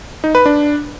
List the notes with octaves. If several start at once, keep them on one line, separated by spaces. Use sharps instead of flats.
D#4
B4
D4